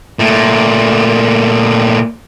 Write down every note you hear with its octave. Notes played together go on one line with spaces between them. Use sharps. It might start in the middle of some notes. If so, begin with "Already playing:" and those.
A#2 A3